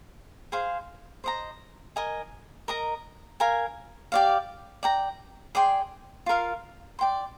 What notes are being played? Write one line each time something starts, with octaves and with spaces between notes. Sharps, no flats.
G#4 C5 F5
C5 D#5 A#5
A#4 D#5 G#5
A#4 D#5 A#5
A#4 F5 G#5
G4 D5 F5
D5 G5 A#5
G#4 D5 G5 C6
F4 A#4 F5
D5 G5 C6